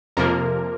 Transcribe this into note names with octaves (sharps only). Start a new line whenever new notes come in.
F2 C3 F3 A#3 A#4